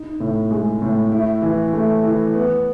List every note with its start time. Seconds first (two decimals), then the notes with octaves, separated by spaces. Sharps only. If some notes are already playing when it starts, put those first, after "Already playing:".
Already playing: D#4
0.20 A2
0.51 G#3
0.82 A2
1.12 E4
1.42 E3
1.73 A3
2.03 E3
2.34 B3